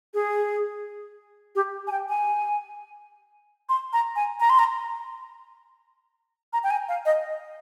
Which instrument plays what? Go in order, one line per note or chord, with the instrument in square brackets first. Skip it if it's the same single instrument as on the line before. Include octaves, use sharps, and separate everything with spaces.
[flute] G#4
G4
G#5
G5
G#5
C6
A#5
G#5
A#5
C6
A#5
A#5
G5
G#5
F5
D#5